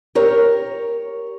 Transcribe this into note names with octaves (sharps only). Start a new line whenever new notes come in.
G4 A#4 C#5